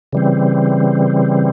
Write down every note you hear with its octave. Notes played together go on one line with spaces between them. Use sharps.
C#3 E3 G3 C4